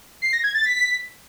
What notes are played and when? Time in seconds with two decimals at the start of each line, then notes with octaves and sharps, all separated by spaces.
0.22 C7
0.33 A#6
0.44 G#6
0.54 A6
0.65 B6